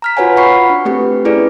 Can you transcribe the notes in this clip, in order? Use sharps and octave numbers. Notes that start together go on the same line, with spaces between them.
A#5 F6 B6
F4 F#4 B4 C#5 F#5 G#5
F4 F#5 B5 C#6 C7
D4
A3 C4 G4 B4
C#4 E4 G#4 B4 D5